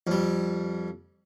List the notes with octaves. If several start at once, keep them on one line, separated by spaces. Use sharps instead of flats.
F2 G3